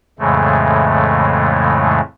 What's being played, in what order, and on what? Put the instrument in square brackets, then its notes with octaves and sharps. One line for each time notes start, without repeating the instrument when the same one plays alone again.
[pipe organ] F2 A2 C#3 E3 G#3 A3